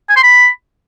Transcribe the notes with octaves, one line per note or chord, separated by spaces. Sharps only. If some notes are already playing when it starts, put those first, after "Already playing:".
G#5
C6
B5